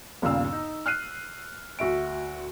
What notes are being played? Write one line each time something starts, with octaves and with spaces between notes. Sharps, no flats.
G1 D#2 A#2 C#3 F5 E6
D#4
F6 F#6 C7 D#7
D2 F#4 E5 D7